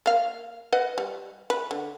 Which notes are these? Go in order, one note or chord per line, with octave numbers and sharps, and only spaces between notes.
A#3 F5
B4 D#5 F#5
G3
B4
D3